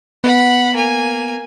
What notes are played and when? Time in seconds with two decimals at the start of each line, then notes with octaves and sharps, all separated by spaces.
0.24 B3 F#5 B5
0.75 A#3 G#5